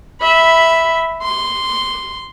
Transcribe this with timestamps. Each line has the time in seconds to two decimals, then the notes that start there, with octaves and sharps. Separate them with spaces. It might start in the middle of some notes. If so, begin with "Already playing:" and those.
0.21 E5 B5
1.23 C6